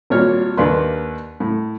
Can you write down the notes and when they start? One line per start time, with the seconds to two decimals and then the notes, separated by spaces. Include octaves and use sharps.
0.10 G#1 A#2 G3 C#5 F6
0.57 D#2 A#3 D4 B4 C6
1.40 A2